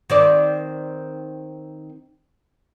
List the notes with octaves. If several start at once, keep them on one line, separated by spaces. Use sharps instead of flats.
D#3 C4 D5